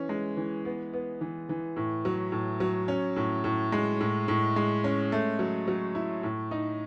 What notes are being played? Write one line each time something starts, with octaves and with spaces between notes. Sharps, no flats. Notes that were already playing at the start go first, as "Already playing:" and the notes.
Already playing: E3 C#4
G#3
E3
B3
B3
E3
E3
A2
F#3
A2
F#3
C#4
A2
A2
G#3
A2
A2
G#3
C#4
A3
F#3
F#3
E4
A2
D#4